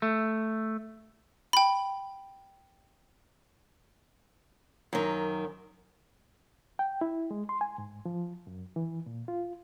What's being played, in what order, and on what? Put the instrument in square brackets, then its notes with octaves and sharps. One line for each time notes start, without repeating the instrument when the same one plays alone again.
[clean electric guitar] A3
[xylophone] G5 B5
[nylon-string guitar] F#2 D#3
[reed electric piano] G5
E4
G#3
C6
G#5
G#2
F3
F#2
E3
A#2
F4